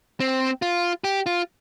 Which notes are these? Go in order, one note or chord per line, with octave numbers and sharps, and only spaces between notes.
C4
F4
G4
F4